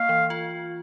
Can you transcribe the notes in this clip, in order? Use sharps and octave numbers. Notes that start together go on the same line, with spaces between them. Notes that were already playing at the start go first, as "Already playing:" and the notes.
Already playing: A#3 F5
E3
F4